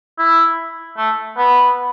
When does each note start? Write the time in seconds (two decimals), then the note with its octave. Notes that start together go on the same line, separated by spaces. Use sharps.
0.18 E4
0.98 A3
1.37 B3